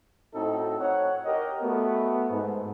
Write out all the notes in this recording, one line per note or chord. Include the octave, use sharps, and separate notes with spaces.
A2 A3 C4 D#4 F#4 A4
C#5 F#5
G4 A#4 C#5 D#5
A3 B3 F#4
G#2